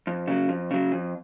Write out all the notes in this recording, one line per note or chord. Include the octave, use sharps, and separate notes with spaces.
F2
C#3 F#3
F2
C#3 F#3
F2